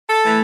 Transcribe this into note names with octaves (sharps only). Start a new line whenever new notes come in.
A4
E3 A3